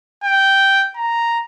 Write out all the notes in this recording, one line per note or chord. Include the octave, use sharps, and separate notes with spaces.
G5
A#5